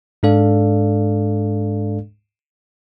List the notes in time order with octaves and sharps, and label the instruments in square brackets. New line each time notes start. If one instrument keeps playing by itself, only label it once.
[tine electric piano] G#2 G#3 D4 A4 D5 F5